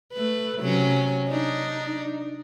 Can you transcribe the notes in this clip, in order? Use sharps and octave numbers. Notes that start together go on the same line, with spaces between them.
A3 B4
C3 F#3 C#4
D4 D#4